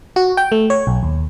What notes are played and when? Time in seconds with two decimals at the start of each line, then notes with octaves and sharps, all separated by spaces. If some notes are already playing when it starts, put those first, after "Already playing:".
0.16 F#4
0.37 G5
0.52 A3
0.70 C#5
0.87 B1
1.03 D#2